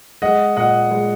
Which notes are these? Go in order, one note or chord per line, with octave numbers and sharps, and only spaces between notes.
G#3 D#5 F#5
A#2 D#5 F#5
G#3